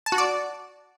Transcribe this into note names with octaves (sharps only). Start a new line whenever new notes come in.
A5
F#4
D5